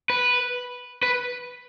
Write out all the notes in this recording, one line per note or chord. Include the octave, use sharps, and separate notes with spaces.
B4
B4